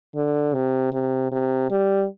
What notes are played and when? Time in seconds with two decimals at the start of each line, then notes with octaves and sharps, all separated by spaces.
0.15 D3
0.54 C3
0.93 C3
1.32 C3
1.71 G3